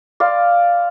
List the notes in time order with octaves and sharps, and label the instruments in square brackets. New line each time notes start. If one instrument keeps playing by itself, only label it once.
[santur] D5 F5 C6